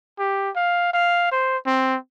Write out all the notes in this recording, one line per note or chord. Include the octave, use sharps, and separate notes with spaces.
G4
F5
F5
C5
C4